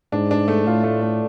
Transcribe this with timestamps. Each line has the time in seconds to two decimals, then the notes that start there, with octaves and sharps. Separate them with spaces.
0.12 G#2 D4
0.31 D4
0.48 A3
0.67 A2 F4
0.84 A3
1.02 A3